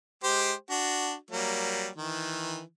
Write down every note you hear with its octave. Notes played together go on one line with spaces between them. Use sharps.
G#3 G4 C5
D4 F#4
F#3 G3 A#3
D#3 E3